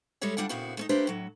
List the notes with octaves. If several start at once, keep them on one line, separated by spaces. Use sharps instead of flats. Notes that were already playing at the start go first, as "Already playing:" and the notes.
G3 G#3 A4 C#5 E5
D2 G2 G3 D4 F4 F#5
A#2 C#3 B3 C4 E4 F#4
A3 C#4 D#4
A3 A#3 D4 G4 B4 C5
A2 F#3